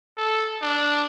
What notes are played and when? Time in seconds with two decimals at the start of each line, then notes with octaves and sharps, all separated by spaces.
0.17 A4
0.62 D4